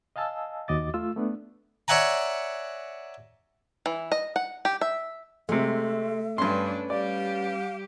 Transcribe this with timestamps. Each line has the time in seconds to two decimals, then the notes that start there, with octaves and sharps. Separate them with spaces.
0.16 D#5 F5 G#5 A5 E6
0.68 D#2 F#4 D#5 D6 A6
0.94 A3 F4 E6
1.16 A3 B3 D4
1.88 C#5 D5 E5 F#5 G#5 A#5
3.86 E3
4.12 D#5
4.36 F#5
4.65 G4
4.81 E5
5.49 C3 G#3 A3 E5
6.38 G2 C#4 D4 B4 C6
6.90 G3 G4 D5 F5